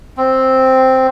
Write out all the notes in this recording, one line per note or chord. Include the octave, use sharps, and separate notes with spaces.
C4